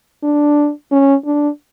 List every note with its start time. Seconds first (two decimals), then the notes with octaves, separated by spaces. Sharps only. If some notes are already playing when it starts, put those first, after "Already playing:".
0.23 D4
0.91 C#4
1.25 D4